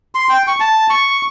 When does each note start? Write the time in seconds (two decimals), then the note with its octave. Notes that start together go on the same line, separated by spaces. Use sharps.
0.15 C6
0.29 G5
0.47 C#6
0.60 A5
0.90 C#6